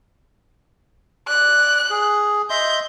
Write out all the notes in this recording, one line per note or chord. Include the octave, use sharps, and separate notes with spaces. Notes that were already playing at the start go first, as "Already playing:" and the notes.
D5 F#6
G#4
D#5 E5 C6 G6